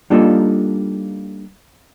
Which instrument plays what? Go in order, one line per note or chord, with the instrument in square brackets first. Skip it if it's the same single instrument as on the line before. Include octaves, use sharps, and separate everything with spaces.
[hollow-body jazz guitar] G3 A#3 D4 D#4 F4 A4